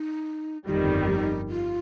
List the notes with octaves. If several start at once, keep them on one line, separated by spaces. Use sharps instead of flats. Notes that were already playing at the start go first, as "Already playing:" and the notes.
Already playing: D#4
G1 F2 D#3 G3 D#4 F4
F4